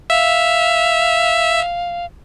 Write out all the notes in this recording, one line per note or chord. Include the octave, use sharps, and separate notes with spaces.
E5 F5